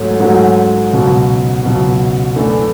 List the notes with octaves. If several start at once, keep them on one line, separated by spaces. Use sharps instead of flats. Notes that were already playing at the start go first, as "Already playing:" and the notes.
Already playing: G#2 F#3 A3 C#4
G#2 F#3 A3 C#4
C#2 B2 F#3
C#2 B2 F#3
F#2 E3 A3 D4